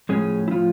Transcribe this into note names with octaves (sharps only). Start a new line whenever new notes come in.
A2 F3 G#3 C#4 G#4
E4
F3 F4